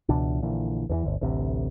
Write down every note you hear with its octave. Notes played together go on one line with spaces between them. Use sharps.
C#2 B2 E3 D4
A#1 A#2 D3 E3
E2 D3 E3
G1 D2
A1 D2 C3